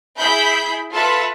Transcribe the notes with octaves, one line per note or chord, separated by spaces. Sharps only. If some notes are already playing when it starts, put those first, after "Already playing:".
E4 G#4 B5 G6 B6
F4 A4 B4 E5 A5 B5